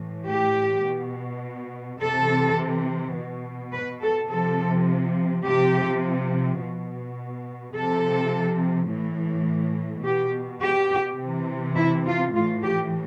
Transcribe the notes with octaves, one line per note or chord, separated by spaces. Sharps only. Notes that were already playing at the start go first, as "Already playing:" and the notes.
Already playing: A2 E3
G4
B2
C3 E3 A4
B2
B4
A4
C3 F3 A4
C3 F3 G4
B2
C3 F3 A4
A2 E3
B2 G4
G4
C3
E3
E4
F4
A2 E3 F4
G4